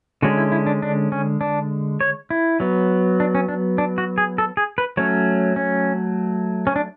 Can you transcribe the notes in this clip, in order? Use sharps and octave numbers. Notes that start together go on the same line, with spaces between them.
D3 G#3 C#4 F#4
E4
E4
D4
D4
C#4
D4
C#5
E4
F#3 B3
D4
C#4
D4
D4
F#4
G#4
A4
G#4
B4
F#3 A3 C#4 C#5
C#4
C#4
D4